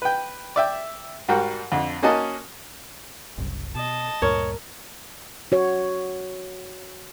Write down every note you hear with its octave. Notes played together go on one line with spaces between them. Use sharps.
B4 G5
D5 E5 G5
G#2 G3 F#4 A#4 G5
F2 D3
A#3 C#4 D#4 F#4 D#5 A5
F#1 C2
B2 D#5 A5
D2 G2 A#2 A#4 C#5
F#4 C#5